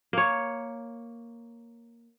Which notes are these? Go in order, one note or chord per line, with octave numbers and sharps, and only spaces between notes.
A#3 C#5